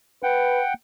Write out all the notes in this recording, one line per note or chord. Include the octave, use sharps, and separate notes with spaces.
B4 F#5 G5